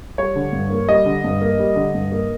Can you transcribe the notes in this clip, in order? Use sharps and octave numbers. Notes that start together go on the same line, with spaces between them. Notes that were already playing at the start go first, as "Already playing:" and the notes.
G3 C#5
D3
G2
A#3
G3 D#5
D3
G2
A#3
G3
D3
G2
A#3